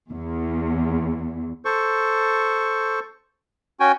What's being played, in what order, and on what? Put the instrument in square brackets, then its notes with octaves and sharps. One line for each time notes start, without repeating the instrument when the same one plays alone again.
[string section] E2
[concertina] A4 C5 C#6
C#4 F#4 G5 G#5